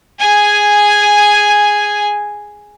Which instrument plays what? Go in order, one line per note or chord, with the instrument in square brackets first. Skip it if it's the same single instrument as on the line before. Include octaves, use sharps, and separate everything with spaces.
[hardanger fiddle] G#4 G#5